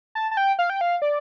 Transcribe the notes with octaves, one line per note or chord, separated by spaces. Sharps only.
A5
A5
G5
F5
G5
F5
D5